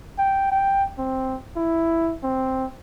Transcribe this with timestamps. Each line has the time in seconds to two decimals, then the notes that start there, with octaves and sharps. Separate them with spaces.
0.18 G5
0.51 G5
0.98 C4
1.57 E4
2.23 C4